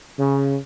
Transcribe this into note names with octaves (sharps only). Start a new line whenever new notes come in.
C#3